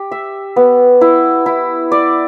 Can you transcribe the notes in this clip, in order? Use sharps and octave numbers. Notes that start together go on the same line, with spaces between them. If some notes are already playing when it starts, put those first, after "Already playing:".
Already playing: G4
E5
B3
E4
E4
D5